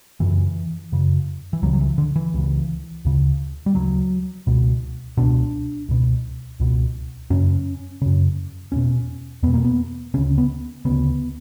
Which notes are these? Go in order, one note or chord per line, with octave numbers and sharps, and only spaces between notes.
F#2 C#3 E3
F#2 C#3
E3
C#2 C#3 F#3
F#3
E3
D3
E3
C#2 C#3
D2 C#3
G3
D2 C#3 F#3
C#2 B2
C#2 B2 D4
C#2 B2
C#2 B2
F#2 C#3 C#4
F#2 C#3
E2 B2 C#4
E2 B2 B3
A#3
B3
D2 C#3 C#4
B3
D2 C#3 B3